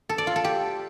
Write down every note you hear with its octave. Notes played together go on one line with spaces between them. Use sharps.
A4
D5
F4
A4
G4